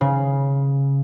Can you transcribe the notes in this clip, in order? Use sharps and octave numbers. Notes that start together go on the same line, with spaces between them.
C#3